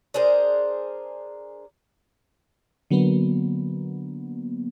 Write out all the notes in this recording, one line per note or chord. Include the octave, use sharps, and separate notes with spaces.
D4 G#4 A#4 C5
D3 F#3 A#3 B3